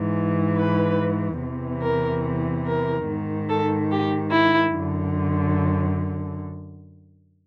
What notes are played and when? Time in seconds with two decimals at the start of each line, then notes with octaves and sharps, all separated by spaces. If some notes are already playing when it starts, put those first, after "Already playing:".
Already playing: G#2 E3
0.57 B4
1.40 E2 C3 E3
1.82 A#4
2.66 A#4
3.07 G#2 D#3
3.50 A4
3.91 G4
4.32 E4
4.75 F#2 D3